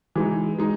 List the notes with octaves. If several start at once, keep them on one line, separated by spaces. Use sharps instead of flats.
E3 G#3 D#4
G#3 D#4